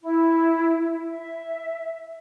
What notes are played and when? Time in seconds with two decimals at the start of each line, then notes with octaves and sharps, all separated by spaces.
0.02 E4
1.06 E5